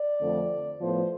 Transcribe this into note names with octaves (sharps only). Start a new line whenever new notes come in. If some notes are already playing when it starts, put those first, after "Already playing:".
Already playing: D5
F2 D3 A3 C4
A2 F3 B3 C5